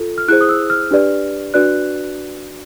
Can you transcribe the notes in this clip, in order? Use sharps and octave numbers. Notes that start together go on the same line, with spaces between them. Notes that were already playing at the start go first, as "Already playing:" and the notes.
Already playing: F4 A4
F6
E4 G#4 C5 F#6
D#6
E6
F6
D4 G4 B4 D5
D4 F#4 B4 D5 F#6